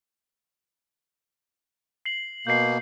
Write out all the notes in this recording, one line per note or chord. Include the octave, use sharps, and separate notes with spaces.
C7 F#7
B2 A#3 G6 C7